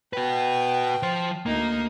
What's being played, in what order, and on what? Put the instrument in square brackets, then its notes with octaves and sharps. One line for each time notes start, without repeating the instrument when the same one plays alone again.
[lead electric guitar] F#4 B4 [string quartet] G5
[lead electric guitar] F3 C5
[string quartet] D2 D#4 D#6 [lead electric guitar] A#3